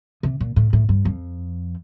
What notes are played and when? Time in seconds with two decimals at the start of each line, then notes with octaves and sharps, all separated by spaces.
0.23 C3
0.40 A#2
0.56 A2
0.73 A2
0.89 G2
1.05 F2